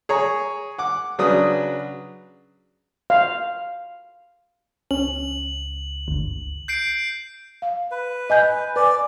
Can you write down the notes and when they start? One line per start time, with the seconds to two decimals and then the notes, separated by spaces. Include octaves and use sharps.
0.09 G#4 C#5 A#5
0.78 F#5 D6
1.19 C#3 F#3 D4 B4 D#6
3.10 F5
4.91 C#2 C#4 F#7
6.08 G1 D2
6.68 G6 C7 D7
7.62 F5
7.91 B4
8.30 D#5 G#5 G6
8.76 B4 D5 G#5